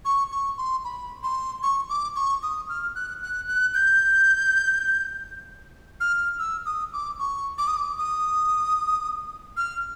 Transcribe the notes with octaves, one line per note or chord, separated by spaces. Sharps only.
C#6
C#6
C6
B5
C6
C#6
D6
C#6
D#6
F6
F#6
F#6
F#6
G6
F6
E6
D#6
D6
C#6
D6
D#6
D6
D#6
F6